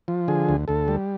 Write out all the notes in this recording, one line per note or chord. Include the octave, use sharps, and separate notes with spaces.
F3
D3 G#4
D2
D2 A4
G3